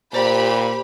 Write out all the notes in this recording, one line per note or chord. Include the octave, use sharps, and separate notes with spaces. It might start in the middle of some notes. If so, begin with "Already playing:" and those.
A#2 G4 C5 D5 A#5 B5